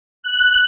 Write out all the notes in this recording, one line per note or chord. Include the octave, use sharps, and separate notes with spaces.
F#6